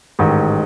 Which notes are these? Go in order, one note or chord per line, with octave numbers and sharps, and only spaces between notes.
A1 G#2 D#3